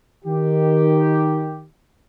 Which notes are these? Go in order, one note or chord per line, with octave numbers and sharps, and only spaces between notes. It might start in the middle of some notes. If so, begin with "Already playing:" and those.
D#3 G4